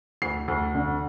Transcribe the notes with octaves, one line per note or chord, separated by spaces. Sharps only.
D2 C7
D2
D3